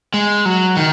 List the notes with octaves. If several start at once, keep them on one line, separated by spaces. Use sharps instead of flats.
G#3
F#3
D#3